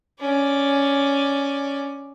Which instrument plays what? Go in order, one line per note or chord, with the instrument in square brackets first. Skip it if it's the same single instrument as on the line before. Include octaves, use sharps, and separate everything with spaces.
[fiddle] C#4 D5